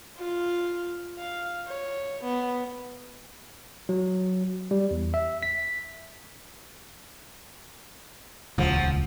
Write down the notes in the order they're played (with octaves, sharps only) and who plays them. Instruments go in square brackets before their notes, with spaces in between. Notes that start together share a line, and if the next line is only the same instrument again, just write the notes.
[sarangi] F4
F5
C#5
B3
[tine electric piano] F#3
G3
E2
E5
B6
[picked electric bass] D#1 C#2 [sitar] F3 F#3